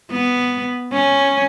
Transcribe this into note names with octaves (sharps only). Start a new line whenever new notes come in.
B3
C#4